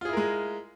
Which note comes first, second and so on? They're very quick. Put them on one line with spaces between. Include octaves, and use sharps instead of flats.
F4 G#4 E4 A#4 G#3